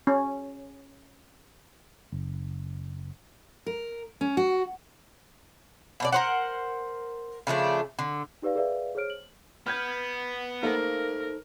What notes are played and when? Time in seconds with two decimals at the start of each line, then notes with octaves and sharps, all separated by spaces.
0.07 C#4
2.12 F#1
3.66 A#4
4.21 C#4
4.37 F#4
6.00 B2 D4 D5
6.12 A#4 C5 F#5
7.47 C#3 F3 A3 D4
7.99 D3
8.42 D#4 G4 B4 D5 F5
8.55 G#4 A#4 B4 D5 E5 F5
8.95 G#4 C5 C#5 F6 D7
9.10 F#7
9.67 B3 F6 G6 G#6
10.63 A3 A#3 D#4 A4 A#4 C5